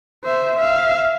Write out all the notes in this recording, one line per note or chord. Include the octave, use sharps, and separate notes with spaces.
C5 E5
E5 F5